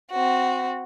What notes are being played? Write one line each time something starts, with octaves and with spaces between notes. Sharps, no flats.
C4 F#4